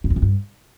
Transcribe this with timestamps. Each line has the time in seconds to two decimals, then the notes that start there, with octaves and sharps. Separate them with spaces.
0.04 G2
0.10 E2
0.16 A#2
0.22 G2